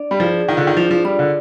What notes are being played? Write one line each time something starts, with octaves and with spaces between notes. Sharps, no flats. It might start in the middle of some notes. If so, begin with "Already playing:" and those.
Already playing: D4 D5
G3
F3 G#4
D#3 F4
D3
D#3
F3 D4
F3
G3 D5
D3